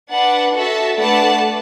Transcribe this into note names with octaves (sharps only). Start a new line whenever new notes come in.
D4 B4 F#5 A5
F#4 A4 E5 A5
A3 D4 B4 F#5 A5